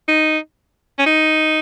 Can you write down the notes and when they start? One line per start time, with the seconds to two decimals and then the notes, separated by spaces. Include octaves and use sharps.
0.08 D#4
0.99 C#4
1.06 D#4